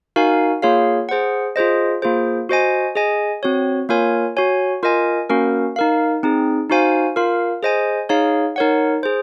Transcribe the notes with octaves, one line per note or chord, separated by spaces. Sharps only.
D#4 F#4 A#4 F5 G#5
A#3 F4 G#4 C#5 F5
G#4 C5 F#5
F4 G#4 C5 D#5
A#3 F4 G#4 C5
F#4 C5 D#5 G#5
G#4 D#5 G#5
C4 F#4 C#5
A#3 F4 A#4 C#5 G#5
F#4 C#5 G#5
F4 A#4 D#5 G#5
A#3 C#4 F#4 A#4
D#4 A#4 F5
C4 D#4 G#4
D#4 F#4 C5 F5 G#5
F4 A#4 F5
G#4 C5 D#5 G#5
D#4 G#4 C#5 F5
D#4 A#4 C#5 F#5
G#4 C5